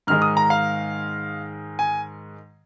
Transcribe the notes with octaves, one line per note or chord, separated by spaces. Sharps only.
G#2 D#3 G#3 F6
D#6
A#5
F5
G#5